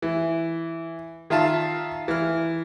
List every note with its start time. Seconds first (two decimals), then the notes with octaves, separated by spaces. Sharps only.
0.02 E3
1.30 D#3 F4 E5 F5 A5
2.08 E3 F6